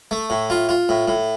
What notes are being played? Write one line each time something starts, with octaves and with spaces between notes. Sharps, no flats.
A3
A2
F4
F4
A2
A2